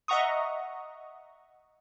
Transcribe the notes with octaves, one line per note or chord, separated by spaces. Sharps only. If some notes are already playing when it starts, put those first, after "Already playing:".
D#5 E5 F#5 A#5 C#6 D#6